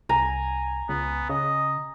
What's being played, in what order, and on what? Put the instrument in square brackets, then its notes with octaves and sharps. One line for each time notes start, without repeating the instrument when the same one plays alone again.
[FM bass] C2 [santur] G#5 A#5
[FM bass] C#2 [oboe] B3
[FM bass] C#3 [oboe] D#5